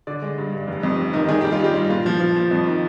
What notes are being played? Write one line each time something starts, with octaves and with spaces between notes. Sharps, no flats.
D3 D5
G#3
G2
G2
F1
F2
F1
D#3
D#3 G#4
G3 G4
F4
G2 G4
G3
A#2 F4
F3
F3
F3
F2
D#3